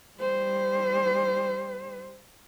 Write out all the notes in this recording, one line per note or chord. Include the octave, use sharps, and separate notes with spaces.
G3 C5